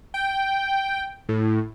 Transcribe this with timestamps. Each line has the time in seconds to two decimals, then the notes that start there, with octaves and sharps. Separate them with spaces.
0.14 G5
1.29 A2